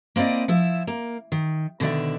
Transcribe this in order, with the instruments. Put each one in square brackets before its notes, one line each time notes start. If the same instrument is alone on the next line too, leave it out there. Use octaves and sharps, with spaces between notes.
[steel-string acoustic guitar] A#3 C4 E4 D5 D#5
F3 E4 E5
A#3
D#3
B2 D3 D#3 G#4 D5 E5